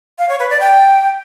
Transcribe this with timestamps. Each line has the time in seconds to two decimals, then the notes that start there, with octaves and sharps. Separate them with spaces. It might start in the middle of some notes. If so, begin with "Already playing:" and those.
0.19 F5
0.29 C#5
0.40 B4
0.50 D5
0.60 G5